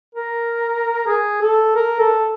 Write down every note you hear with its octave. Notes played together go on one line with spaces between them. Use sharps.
A#4
G#4
A4
A#4
A4